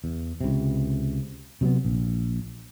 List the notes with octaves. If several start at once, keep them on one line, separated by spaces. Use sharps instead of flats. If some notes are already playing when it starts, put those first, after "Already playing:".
E2
C#2 C3
C3 F#3 A3 B3
A#1